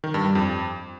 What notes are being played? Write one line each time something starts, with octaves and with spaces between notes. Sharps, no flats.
D#3
G2
G3
F2